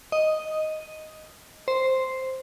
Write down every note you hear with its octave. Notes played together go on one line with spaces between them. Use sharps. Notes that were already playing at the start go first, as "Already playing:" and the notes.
D#5
C5